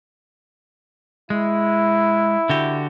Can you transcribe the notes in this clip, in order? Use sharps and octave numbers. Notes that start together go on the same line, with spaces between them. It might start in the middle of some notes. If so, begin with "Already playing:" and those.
G#3 E4
D3 F#4 G4